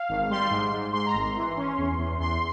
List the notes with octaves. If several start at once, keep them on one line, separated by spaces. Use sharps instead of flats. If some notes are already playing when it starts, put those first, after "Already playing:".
Already playing: F5
G#1
G3 C6
G#2
G#2
G#2 C6
A#5
G#1
C6
E3
C#4
E2
E2
E2 C6